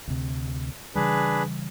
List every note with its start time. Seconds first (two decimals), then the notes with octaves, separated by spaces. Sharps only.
0.08 D2 C3
0.95 C#3 E3 G3 D4 G#4 B4